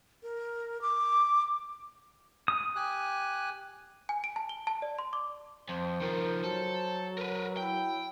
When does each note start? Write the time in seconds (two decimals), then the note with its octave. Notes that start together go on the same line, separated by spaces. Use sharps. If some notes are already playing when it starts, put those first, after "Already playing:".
0.23 A#4
0.82 D6
2.48 D#6
2.76 G4 G#5 F#6
4.09 G#5
4.24 D7
4.36 A5
4.49 G7
4.67 A5
4.82 D5
4.99 C6
5.13 D6
5.69 F2 C5
6.02 D#3 F3 A#4
6.44 F#3 A4
7.18 A#4 B4
7.57 E4 G5